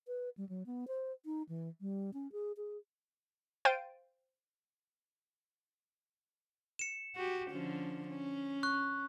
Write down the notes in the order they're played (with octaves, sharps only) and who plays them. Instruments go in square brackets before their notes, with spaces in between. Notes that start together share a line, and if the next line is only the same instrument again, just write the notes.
[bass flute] B4
G3
F#3
B3
C5
D#4
E3
G3
C#4
G#4
G#4
[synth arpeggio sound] C5 F5 G5 A6 D7 D#7
[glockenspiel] C#7 E7
[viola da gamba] F#4 G4
D3 F3 C#4
C#4
[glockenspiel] C#6 F#6